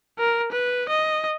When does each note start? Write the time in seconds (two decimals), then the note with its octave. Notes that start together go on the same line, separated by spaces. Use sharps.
0.19 A#4
0.52 B4
0.89 D#5